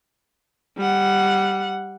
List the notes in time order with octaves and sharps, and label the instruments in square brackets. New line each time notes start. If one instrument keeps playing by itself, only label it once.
[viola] G3 F#5